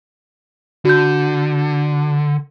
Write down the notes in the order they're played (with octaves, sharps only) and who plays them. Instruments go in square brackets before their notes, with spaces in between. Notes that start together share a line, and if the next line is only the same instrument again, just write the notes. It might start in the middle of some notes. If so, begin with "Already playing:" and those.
[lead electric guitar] D3 [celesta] F#4 G6